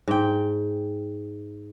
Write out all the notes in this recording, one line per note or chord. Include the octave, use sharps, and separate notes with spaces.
G#2 G5